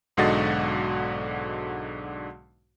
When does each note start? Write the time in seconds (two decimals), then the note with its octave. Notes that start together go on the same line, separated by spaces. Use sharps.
0.17 B1 G#2 D3 F#4 D#5 A6